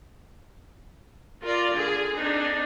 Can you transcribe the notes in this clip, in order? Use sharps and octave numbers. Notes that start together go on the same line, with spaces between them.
F4 A#4 D5
D3 G#4
C4 D4 D#4